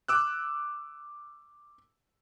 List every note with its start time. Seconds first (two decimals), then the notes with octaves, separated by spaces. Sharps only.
0.08 D6 E6 F#6